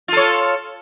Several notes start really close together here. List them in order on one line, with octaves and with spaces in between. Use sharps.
F4 A4 C#5